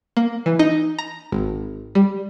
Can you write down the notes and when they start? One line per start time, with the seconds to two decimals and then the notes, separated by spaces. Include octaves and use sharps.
0.17 A#3
0.46 E3
0.59 D#4
0.99 A#5
1.32 G#1
1.95 G3